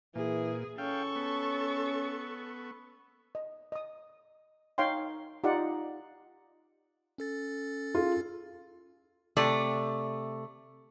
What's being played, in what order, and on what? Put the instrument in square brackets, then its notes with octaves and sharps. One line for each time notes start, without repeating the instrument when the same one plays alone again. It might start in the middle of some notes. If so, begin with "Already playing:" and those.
[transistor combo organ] A#2 [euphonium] E3 [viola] G#4
[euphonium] C#4 [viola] A4 C#6 [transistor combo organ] F5 G5
[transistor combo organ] B3
[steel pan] D#5
D#5 D#6
D#4 C#5 F5 G5 C6
D#4 F4 G4 D5 F#5
[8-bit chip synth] C#4 A4 A6
[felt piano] F4 G#4
[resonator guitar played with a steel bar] C3 A3 D5